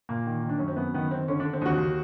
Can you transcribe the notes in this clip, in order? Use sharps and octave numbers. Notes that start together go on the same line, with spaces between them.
A#2 A#3
D#3
D#3
D4
F#2 C#4
C4
F#2 B3
D#3 B3
D#3 C4
D3 C#4
D4
D3
C4
D#2 F#4
D#2